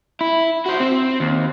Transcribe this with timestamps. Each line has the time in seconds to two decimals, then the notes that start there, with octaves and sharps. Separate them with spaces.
0.21 E4
0.66 F#4 C5
0.80 C4
1.20 D#2